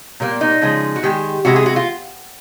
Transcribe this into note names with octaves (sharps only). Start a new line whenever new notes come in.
A#2 G3 A#3
D#4
C#3 F3 G#3
F#4
D#3 G#3 G4
C3 E3 G#3 F#4
G#4
F#4
F4